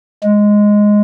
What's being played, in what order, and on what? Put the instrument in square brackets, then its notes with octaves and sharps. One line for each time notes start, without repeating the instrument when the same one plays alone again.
[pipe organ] G#3